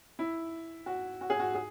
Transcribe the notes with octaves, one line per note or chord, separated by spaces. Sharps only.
E4
F#4
F#4
G#4
F#4
G#4